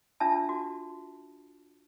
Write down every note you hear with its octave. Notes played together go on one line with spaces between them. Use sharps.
D4 F4 E5 A5
F#4